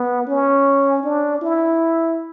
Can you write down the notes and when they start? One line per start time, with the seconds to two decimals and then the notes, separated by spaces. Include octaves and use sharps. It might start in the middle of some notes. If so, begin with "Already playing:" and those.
Already playing: B3
0.28 C#4
1.04 D4
1.42 E4